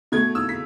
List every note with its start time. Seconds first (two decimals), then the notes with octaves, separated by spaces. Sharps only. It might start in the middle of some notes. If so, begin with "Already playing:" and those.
0.12 B2 A3 G#6
0.35 E6
0.49 B6